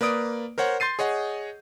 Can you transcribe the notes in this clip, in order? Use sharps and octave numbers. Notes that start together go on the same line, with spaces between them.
A#3 B4 D5 D#6 D7
A#4 C5 C#5 F#5
C6 G6 A6 C7 D#7
G#4 C#5 D#5 F#5